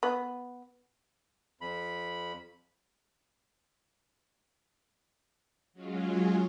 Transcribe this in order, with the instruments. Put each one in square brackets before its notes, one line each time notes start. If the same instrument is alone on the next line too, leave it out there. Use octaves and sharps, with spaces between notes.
[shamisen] B3
[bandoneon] F2 B5
[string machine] F#3 G#3 C#4 F4